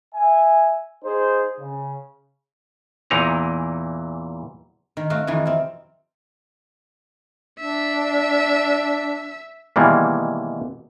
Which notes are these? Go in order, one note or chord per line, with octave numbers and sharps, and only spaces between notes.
E5 G#5
D#4 G#4 C5
C#3
E2 A#2 E3 D#4 A#5
D#3
A3 C4 F#4 F5 G5
F2 C3 D#3 E3
C4 F5
D4 E5
B2 D#3 E3 G3 G#3 A#3